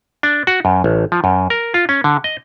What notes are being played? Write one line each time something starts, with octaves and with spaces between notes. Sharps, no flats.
D4
F#4
F#2
A1
F3
F#2
A#4
F4
C#4
D3
D#5